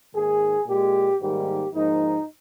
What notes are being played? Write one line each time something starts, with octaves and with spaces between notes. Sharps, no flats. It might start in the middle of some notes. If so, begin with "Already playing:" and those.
G#2 D#3 A#3 G#4
A#2 G#3 G4
G#2 D#3 G3 A#3 G4
G#2 F3 A#3 D#4